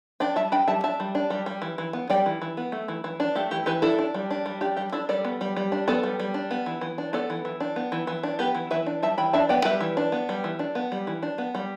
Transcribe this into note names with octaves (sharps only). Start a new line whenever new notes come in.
D4 D5 G5
G3 E5 A5
D4 G5 B5
G3 E5 A5
D4 E5 A5
G3
D4
G3
G3
E3
E3
B3
G3 D5 G5
E3
E3
B3
A3
E3
E3
D4
A3 G4
E3 G4
E3 G4 B4
D4 E4 A4
D4
G3
D4
G3
D4 G4
G3 G4
D4 E4 A4
G3 A4 D5
B3
G3
G3
D4
B3 A4 D5
G3
G3
D4
B3
E3
E3
D4
B3 A4 D5
E3
E3
D4
B3
E3
E3
D4
B3 G4 B4
E3
E3 B4 E5
D4
G3 E5 A5
E3 G5 B5
D4 E5 A5
B3 D5 G5
G3 B4 E5
E3
D4
B3
G3
E3
D4
B3
G3
E3
D4
B3
G3